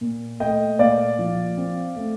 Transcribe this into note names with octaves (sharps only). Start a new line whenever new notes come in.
A#2
A3 D#5 G5
A#2 D5 F5
F3
C4
A3